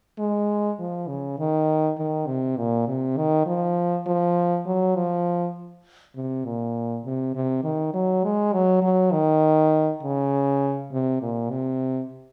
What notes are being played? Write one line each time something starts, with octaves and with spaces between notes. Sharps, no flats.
G#3
F3
C#3
D#3
D#3
C3
A#2
C3
D#3
F3
F3
F#3
F3
C3
A#2
C3
C3
D#3
F#3
G#3
F#3
F#3
D#3
C#3
C3
A#2
C3